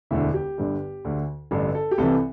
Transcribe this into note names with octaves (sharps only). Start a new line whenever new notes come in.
E1 D2 D3 E4 E5
G4
G1 G2 D3
D2 D3
A1 G2 D3 A4
A4
G4
C2 C3 E3 A4